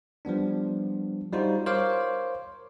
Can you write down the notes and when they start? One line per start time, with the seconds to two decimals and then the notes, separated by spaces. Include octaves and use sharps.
0.25 F3 G3 B3 D4
1.33 G3 D#4 F4 F#4 C5
1.66 A#4 C5 C#5 F5 D6